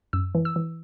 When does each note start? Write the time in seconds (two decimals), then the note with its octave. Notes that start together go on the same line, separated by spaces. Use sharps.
0.13 F#2 E6
0.35 E3
0.45 E6
0.56 E3